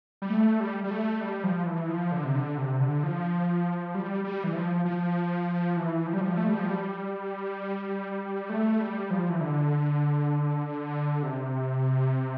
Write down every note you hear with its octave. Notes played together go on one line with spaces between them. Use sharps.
G3
A3
G3
G3
A3
G3
F3
E3
F3
D3
C3
D3
C3
D3
F3
G3
G3
E3
F3
F3
E3
F3
G3
F3
A3
G3
F3
G3
A3
G3
F3
E3
D3
C3